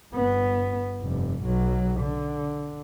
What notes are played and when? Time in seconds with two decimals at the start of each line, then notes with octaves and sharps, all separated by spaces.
0.13 G1 B3
1.01 F1 G2
1.44 B1 F#3
2.01 D3